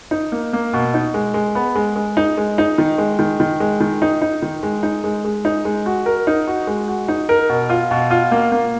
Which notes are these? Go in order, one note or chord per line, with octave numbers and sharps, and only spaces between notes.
D#4
A#3
A#3
B2
D#4
G#3
G#3
B3
G#3
G#3
D#4
G#3
D#4
D#3
G#3
D#3
D#3
G#3
D#3
D#4
D#4
D#3
G#3
D#4
G#3
G#3
D#4
G#3
F#4
A#4
D#4
F#4
G#3
F#4
D#4
A#4
B2
F4
B2
F4
A#3
A#3